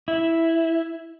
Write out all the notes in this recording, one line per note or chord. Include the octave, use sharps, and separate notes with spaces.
E4